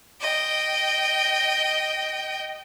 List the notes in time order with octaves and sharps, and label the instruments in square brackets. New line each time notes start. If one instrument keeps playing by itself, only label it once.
[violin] D#5 G5